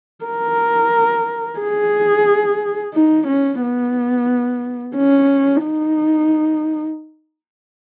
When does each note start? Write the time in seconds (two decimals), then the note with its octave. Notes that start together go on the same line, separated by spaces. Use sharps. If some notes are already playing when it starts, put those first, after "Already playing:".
0.25 A#4
1.59 G#4
2.94 D#4
3.27 C#4
3.61 B3
4.96 C#4
5.63 D#4